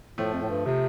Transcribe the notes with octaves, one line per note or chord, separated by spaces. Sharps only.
A2 F3 A3
F2
A2
G2
C3 F3